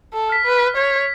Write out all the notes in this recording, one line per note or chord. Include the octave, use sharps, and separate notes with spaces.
A4
F6 B6
B4
C#5 G#6